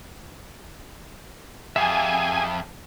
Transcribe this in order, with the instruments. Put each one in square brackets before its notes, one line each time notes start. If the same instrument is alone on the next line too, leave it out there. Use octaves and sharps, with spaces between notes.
[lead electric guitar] F2 [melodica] G4 G#4 [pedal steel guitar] E5 F5 A5 [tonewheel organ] G#5